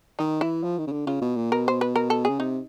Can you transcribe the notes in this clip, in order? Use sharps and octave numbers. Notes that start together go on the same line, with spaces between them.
D#3 D#4
E3 E4
F3
D#3
C#3
D3
C#3 F4
B2
A#2
B2 A#4
C5
B4
A#4
A4
C#3 G#4
C3 D#4